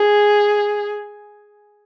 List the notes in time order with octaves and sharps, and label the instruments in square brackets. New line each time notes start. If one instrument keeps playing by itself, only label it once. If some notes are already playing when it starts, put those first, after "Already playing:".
Already playing: [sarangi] G#4